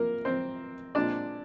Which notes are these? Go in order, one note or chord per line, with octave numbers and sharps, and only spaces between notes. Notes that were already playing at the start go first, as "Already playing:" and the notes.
Already playing: C3 A#3 A#4
C4 C5
A#2 G#3 C4 D4 D5